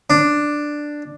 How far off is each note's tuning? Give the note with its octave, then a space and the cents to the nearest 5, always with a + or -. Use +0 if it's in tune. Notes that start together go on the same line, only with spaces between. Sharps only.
D4 +5